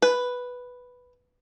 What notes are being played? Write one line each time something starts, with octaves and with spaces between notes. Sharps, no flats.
B4